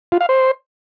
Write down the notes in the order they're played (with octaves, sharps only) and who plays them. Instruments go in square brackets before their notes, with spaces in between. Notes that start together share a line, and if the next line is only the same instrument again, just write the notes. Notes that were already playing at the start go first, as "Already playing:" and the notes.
[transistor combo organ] F4
F5
C5